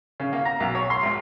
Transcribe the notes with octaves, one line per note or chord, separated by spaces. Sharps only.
C#3
A#3
A#5
B1
C#5
C6
G#1